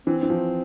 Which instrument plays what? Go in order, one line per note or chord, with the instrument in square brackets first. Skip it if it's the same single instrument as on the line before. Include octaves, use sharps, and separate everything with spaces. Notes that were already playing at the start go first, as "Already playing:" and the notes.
[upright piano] E3 [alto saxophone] C4
[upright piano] E3
F3